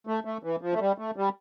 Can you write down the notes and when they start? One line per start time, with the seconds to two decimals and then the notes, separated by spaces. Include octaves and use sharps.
0.07 A3
0.25 A3
0.43 E3
0.61 F3
0.74 A3
0.80 G3
0.98 A3
1.16 G3